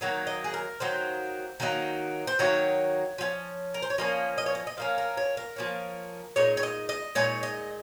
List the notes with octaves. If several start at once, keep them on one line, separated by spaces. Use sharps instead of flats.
D#3 F#3 A#3 D#4 C#5
D#5
G#4
A#4
D#3 F#3 A#3 D#4 C5
D#3 F#3 A#3 D#4
C5
D#3 F#3 A#3 D#4 C#5
F3 A#3 C#4
A#4
C5
C#5
F3 A#3 C#4 D#5
D#5
C#5
D#5
D#5
F3 A#3 C#4 F5
A#4
C#5
A#4
F3 A#3 C#4
A#2 G#3 D#4 C#5
C#5
D#5
D#5
A#2 G#3 D#4 C#5
D#5